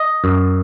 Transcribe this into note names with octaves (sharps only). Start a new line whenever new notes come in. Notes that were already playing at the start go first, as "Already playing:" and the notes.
Already playing: D#5
F#2